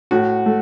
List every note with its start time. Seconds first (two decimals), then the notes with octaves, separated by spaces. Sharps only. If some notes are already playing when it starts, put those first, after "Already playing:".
0.11 A2 F#4
0.46 A3